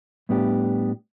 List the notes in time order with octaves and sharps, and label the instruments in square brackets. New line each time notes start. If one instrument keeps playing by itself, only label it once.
[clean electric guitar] A2 G3 B3 D4 G4